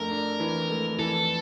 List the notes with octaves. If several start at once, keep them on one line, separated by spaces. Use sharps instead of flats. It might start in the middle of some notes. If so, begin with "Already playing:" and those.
Already playing: F2 A3 D4 A#4
D4
E3
A3
E3 A4